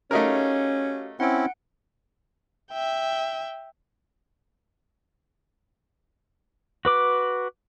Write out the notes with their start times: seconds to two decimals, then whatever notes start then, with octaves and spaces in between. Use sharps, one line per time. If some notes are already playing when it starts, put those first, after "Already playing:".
0.11 A3 C#4 D#4 F#4 G4 A#4 F5
1.20 C4 C#4 E4 F#5 D7
2.72 E5 G5
6.85 F#4 B4 D6